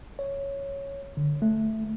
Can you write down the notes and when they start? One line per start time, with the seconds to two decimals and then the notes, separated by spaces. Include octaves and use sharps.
0.19 C#5
1.17 D3
1.42 A3